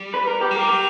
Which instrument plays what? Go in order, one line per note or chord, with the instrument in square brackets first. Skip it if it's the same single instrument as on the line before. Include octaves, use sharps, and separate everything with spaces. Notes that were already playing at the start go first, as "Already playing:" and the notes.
Already playing: [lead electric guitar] G3
[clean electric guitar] B4
A#4
G4
[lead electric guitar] A#3
[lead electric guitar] G3 [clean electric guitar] A#4
[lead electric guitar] F#3 [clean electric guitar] G4